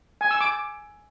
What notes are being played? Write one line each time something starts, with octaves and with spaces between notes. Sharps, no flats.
G#5
E6
D6